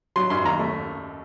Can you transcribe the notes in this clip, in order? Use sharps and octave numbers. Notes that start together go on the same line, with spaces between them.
F#3 C6
F#2 C6
D#2 A#5
A3